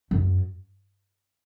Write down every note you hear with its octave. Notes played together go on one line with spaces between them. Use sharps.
F#2